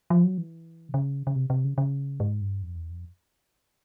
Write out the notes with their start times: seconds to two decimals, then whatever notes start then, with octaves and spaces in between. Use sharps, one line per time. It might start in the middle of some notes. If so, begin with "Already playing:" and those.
0.10 F3
0.24 F#3
0.38 E3
0.89 C3
0.94 C#3
1.27 C#3
1.36 C3
1.50 C3
1.64 C#3
1.78 C#3
2.20 G#2
2.41 G2
2.62 F2
2.76 E2
2.90 F2